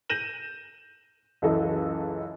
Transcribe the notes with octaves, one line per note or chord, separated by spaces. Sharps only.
G6 A#6 D#7 E7 F#7
C#2 F#2 E3 E4 A4 D#5